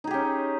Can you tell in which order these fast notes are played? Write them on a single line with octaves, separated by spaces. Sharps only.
D#4 G#4 G4 C#4